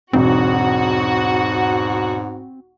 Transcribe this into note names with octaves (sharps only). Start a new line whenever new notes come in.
E1 B1 G#2 C4 F#4